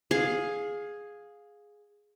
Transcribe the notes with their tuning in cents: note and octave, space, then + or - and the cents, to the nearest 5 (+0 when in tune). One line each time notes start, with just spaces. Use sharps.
G#4 +0 F5 +20